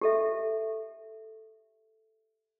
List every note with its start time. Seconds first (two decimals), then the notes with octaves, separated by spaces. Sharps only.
0.01 G4 A4 E5